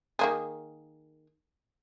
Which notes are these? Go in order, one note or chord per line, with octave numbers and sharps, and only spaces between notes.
D#3 A#3 G#4